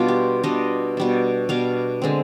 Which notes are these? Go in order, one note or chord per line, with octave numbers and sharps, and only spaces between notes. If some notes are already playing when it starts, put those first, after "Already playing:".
Already playing: B2 G3 D4 F4
G4
B2 G3 D4 D#5
B2 G3 D4
B2 G3 D4 F5
D3 G#3 C4